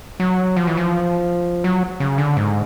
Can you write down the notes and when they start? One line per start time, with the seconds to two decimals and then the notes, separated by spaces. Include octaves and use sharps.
0.20 F#3
0.56 F3
0.67 E3
0.77 F3
1.64 F#3
2.00 C#3
2.18 D3
2.37 G#2